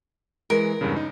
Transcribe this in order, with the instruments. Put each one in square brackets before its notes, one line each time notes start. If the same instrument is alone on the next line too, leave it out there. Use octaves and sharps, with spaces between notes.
[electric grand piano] E3 G#3 [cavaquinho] A#4
[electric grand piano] E2 G2 C#3
D#4